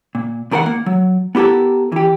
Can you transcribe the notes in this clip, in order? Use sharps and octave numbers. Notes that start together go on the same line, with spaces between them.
A#2
E2 D#3 A#4 C5 F#5
A#3
F#3
B3 E4 G4 A4 A#4
E3 G4